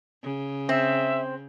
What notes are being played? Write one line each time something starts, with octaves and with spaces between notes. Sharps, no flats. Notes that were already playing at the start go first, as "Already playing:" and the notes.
C#3
C4 E5